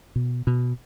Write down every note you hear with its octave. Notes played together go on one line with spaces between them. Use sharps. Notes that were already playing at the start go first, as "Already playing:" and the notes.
B2
B2